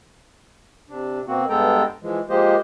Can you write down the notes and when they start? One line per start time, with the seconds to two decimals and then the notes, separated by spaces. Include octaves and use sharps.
0.89 C3 D4
1.27 B2 A#3 C4 F#4
1.49 G2 G#3 B3 A4 G5 A#5
2.02 E3 F3 G#3
2.29 F3 G#3 A#3 G4 C5 D#5